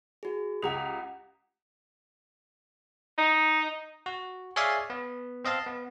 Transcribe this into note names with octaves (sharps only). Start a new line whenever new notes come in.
F#4 G#4
C#2 G4 F#5 A#5 D#6 F7
D#4
F#4
G#4 C#5 D5 E5 F5 G#5
B3
C4 D#5 F5 A5
B3